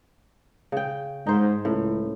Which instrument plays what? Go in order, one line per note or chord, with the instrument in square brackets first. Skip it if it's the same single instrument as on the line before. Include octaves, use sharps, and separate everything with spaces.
[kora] C#3 G5
[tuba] G#2 [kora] D#4 C5
[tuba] C#2 [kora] A2